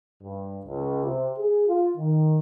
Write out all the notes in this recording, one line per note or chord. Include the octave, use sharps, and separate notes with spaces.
G2
C#2
C3
G#4
F4
D#3